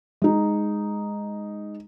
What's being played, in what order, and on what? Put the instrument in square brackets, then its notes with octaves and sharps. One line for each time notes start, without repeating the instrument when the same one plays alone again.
[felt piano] G#3 D#4